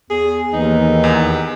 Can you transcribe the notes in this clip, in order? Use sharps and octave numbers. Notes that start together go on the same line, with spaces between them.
E2 G#4
D#2 E3 D#4
E2